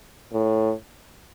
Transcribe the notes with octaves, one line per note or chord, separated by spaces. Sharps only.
A2